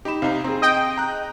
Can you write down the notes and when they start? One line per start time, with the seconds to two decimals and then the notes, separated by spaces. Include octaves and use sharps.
0.05 D#4 G4 B5 E7
0.22 C3 D#4 F5
0.44 C4 G#4 A#5
0.62 D#5 G5
0.98 A#5 F#6